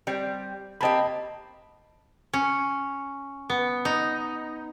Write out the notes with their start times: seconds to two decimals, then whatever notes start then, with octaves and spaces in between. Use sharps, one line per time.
0.07 G3 C4
0.81 A#3 C4 G4 D#5 A5 B5
2.33 C#4
3.50 B3
3.85 D#4